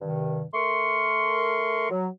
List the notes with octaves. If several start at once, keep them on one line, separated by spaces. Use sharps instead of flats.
G2 C3 D#3
A3 A#4 C6 C#6
F#3